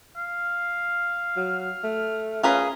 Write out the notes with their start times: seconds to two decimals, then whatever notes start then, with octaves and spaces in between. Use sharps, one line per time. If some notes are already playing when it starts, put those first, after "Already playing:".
0.16 F5
1.37 F#3 F6
1.84 A3
2.43 C#4 F4 G#4 A#4 B4